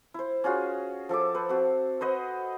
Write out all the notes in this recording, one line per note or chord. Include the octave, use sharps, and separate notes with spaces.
E4 C5
C#4 F4 F#4 G#4
F3 A4 E5 D6
B4 C5
C4 F#4
B4 C5 D#5 F#5